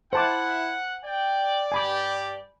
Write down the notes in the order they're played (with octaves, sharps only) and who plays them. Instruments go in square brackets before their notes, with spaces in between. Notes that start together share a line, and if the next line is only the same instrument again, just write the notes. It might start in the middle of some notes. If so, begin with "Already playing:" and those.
[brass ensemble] E4 [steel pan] C5 A5 D6 [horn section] F#5
[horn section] D5 [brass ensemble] G5
[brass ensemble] G2 G4 [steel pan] G#5 B5 D6